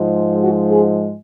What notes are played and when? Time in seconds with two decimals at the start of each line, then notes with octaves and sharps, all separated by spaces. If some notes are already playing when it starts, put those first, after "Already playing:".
Already playing: G#2 F3 G#3
0.41 F#4
0.71 G#4